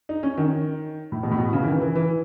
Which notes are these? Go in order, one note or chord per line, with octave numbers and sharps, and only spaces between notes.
D#4
C#4
D#3
A2
B2
A2
B2
C#3
E3
D#3
E3
E3